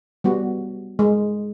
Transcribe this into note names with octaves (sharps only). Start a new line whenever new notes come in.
G3 B3 F#4
G#3